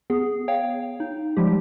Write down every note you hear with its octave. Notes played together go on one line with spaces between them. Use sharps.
B3 G#4
C#5 F5 G5
D#4
F3 G3 G#3 G4